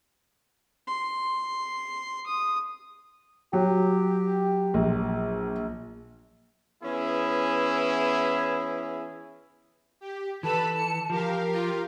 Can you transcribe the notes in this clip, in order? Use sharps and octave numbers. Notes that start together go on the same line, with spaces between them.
C6
D#6
F#3 G4
A#1
E3 B3 C#4 E4 G#4
G4
E3 A4 B4 A5 B5
C#7
F3 G4 A#4 F5
F4